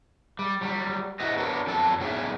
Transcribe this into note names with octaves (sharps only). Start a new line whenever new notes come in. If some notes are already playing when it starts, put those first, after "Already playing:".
G3
F#3 G3
E4 F#4 C5 D#5
B3 D4 F#4 A#4 C#5
F2 B2 F#3 A4 A5
F#3 B3 C#4 D#4 G#4 E5